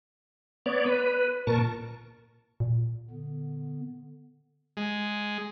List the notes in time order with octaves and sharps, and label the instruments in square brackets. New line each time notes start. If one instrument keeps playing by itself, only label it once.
[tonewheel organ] B3 C#5 D5
B4
A#2 A#4 A5 C#6
[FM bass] A#2
[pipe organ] D3 B3
[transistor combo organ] G#3